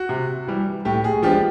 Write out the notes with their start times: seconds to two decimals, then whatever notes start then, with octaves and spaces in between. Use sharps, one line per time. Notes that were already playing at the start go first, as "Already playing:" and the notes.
Already playing: F#4
0.09 C3
0.47 E3 G3
0.85 A2 G4
1.04 G#4
1.23 F3 G#3 B3 D4 G4